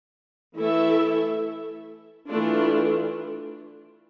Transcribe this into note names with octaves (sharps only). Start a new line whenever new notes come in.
E3 A3 E4 A4 E5
E3 A3 D4 F4